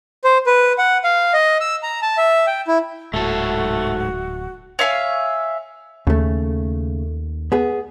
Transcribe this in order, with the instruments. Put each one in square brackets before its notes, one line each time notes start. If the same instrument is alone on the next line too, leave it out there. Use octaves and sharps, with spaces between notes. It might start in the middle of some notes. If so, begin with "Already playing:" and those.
[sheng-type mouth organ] C5
B4
F#5
F5
D#5
E6
A#5
A5
E5
G5
E4
[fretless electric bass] D1 [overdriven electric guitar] G#2 A4 [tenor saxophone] A3 [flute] F#4
[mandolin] C#5 E5 F5 G#5
[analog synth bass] D#2 [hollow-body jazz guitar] C#3 A3
[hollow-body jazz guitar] B3 G#4